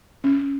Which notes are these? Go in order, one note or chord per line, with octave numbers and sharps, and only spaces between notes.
C#4